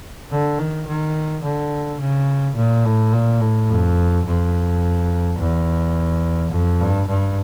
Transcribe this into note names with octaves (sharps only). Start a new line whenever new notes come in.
D3
D#3
D#3
D3
C#3
A#2
A2
A#2
A2
F2
F2
E2
F2
G2
G2